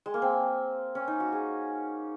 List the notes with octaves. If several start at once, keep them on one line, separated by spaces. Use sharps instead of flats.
G#3
A#3
C4
C#4
D#4
F#4
G#4